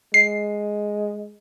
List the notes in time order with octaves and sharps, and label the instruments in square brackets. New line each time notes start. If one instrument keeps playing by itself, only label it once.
[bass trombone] G#3 [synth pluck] C7